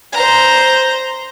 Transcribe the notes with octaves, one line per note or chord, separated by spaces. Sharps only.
C5 A#5